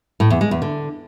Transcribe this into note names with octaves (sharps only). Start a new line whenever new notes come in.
A2
E2
G#3
E2
D3